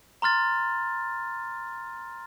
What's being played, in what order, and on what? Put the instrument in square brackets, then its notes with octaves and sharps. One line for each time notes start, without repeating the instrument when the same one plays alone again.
[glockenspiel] A#5 C6 F6 A6